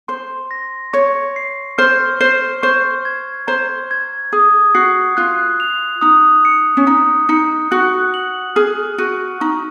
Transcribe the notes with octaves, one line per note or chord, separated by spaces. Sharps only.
C5 C6
A#6
C#5 C#6
C7
C5 F6
C5 C7
C5 C#6
G#6
C5 A#5
G#6
G#4 D#6
F#4 C7
F4 F#6
F7
D#4 D#6
C#7
C#4
D#4 D#6
D#4 C#7
F#4 F#6
F#7
G#4 F6
F#4 D#7
D#4 C#6